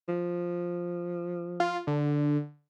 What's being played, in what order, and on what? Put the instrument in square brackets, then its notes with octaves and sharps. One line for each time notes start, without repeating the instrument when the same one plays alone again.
[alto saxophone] F3
[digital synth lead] F4
D3